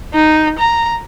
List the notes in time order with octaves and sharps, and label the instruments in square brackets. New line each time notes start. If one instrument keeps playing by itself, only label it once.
[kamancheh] D#4
A#5